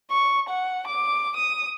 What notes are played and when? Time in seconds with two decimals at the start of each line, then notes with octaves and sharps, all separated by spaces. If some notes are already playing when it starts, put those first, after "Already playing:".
0.11 C#6
0.49 F#5
0.87 D6
1.37 D#6